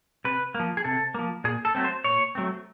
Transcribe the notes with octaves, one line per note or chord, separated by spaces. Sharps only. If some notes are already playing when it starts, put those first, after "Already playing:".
C3 B4
F3 A#3
G#4
C3 A4
F3 A#3
A#2 G#4
A4
F#3 A3 C4
C5
A#2 C#5
F#3 A3 C4